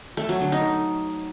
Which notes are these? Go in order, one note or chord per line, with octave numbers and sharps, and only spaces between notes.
A3
F#3
D3
D#4